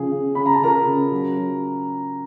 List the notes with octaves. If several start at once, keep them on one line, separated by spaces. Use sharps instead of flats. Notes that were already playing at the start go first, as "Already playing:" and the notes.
Already playing: C#3 F3 G#4
C#3
C#3 B5
A#5
A5
C#3 A#4 A#5
C#3
F#3
F#3